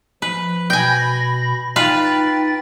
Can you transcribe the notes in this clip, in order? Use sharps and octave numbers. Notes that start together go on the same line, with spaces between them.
F3 B4
B2 G5 G#5 B5 A#6
D#4 F4 B4 G5 A6